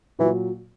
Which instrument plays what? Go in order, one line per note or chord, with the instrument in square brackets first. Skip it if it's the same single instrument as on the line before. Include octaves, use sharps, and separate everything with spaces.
[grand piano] A#2 F#3 [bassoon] E3